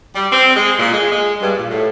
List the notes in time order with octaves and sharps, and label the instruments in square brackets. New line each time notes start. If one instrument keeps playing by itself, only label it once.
[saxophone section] G3
C4
G#3
A#2
G#3
G#3
G2
A#2
A2